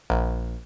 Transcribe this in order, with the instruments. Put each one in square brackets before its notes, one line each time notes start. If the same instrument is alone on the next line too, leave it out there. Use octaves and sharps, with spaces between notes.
[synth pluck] A#1